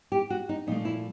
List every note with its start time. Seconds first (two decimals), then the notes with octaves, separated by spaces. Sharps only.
0.12 G4
0.30 F#4
0.49 D#4
0.67 A#2 F3 A3 D#4
0.85 E4